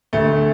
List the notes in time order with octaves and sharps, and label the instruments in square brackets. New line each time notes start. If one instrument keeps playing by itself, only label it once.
[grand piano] D2 A3